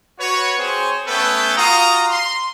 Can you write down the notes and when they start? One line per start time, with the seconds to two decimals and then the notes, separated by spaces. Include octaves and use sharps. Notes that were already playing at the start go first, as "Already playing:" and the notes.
0.19 F#4 B4 C#5
0.57 C4 G#4 C5 C#5
1.07 A3 B3 C#4 A4 B4 G5
1.57 F4 F#4 F5 A#5 D#6
2.10 C6